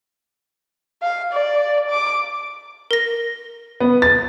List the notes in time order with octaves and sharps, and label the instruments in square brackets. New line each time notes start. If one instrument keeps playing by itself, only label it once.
[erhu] F5
D5
D6
[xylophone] A#4 A#6
[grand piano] B3
A6